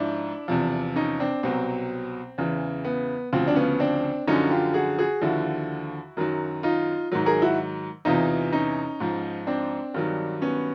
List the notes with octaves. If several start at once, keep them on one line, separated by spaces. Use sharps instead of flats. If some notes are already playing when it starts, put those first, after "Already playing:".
Already playing: G#2 F3 D4 E4
E2 C3 F3
C#4 D#4
C4 D4
C2 B2 F#3 C4
E2 C#3 E3
B3
D2 C#3 F3 C4
D4
B3 C#4
C4 D4
F#2 D3 F3 C#4 D#4
F4 G4
F#4 G#4
F#4 G#4
D#2 D3 F3 E4 F#4
F#2 D#3 F#3
D#4 F4
G#2 D#3 F#3
G#4 A#4
E4 F#4
E2 C3 E3 D#4 F4
C#4 D#4
G#2 F3
C4 D4
G2 D#3 F#3
B3 C#4